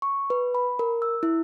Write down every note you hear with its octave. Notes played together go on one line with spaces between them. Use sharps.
C#6
B4
B5
A#4
E6
E4